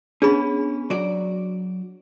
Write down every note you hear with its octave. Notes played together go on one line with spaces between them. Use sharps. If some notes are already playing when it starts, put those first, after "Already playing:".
B3 C#4 D4 G#4 B5
F#3 F#4 D5